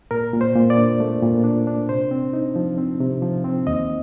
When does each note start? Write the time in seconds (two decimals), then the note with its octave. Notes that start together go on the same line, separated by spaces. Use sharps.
0.11 A#2 A#4
0.33 A#2
0.41 C5
0.56 A#2
0.70 D5
0.77 D4
1.00 A3
1.22 A#2
1.44 D4
1.67 D4
1.89 C3 C5
2.11 C4
2.33 D#4
2.56 F3
2.78 C4
3.00 C3
3.22 F3
3.44 C4
3.67 D#2 D#5